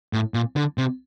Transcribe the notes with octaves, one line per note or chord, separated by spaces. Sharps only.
A2
A#2
D3
C3